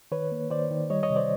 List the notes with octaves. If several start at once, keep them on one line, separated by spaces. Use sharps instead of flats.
D#3 B4 C#5
A#3
D#3 C5 D5
D#3
G3 C#5 D#5
C#5 D#5
C3
C5 D5